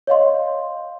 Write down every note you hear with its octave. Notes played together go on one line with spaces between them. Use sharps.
C#5 D#5 F5 C6